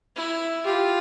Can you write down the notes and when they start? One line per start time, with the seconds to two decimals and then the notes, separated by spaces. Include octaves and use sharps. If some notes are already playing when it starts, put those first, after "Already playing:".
0.16 E4
0.65 F4 G4